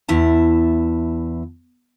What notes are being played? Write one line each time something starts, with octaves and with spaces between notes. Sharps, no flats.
E2 E4 A5